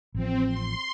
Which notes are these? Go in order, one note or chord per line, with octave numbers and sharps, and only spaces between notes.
A1 F3 C4
C6